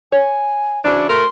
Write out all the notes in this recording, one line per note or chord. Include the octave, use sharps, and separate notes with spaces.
C#5 G#5
C#3 E3 C4 D4 F#4
A3 A#4 C6